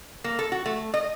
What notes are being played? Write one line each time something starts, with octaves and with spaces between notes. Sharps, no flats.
A#3
A4
F#4
A3
D#5